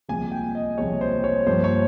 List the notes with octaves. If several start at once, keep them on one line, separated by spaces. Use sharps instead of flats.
C2 A#2 F3 G#3 G#5
G5
D#5
C2 A#2 F3 G#3 C#5
C5
C#5
G2 F3 A#3 C5
C#5